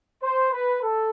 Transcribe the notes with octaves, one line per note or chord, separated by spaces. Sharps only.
C5
B4
A4